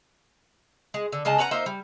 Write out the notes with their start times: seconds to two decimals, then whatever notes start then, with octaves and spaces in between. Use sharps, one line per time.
0.94 G#3
1.12 D3
1.25 C#3 G#3 D#5 A5
1.38 C#4 B4 F#5 A#5
1.51 A#3 D#4 C5 E5
1.66 G3